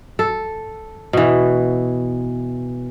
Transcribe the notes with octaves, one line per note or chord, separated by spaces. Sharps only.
A4
B2 E3